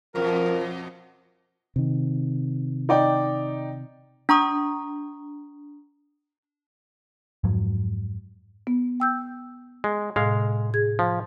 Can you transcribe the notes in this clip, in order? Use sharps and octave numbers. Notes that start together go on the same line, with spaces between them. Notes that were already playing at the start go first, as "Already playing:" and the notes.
F2 B2 F3 A#4
C3 D#3
D#4 D5 G5
D4 A#5 C#6 D#6
F2 G#2 F3 F#3
B3
G5 E6 G6
G#3
A2 C3 G#3 F5
G#4 G#6
F3